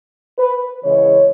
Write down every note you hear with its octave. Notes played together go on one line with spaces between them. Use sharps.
B4
C#3 E3 G#3 C#5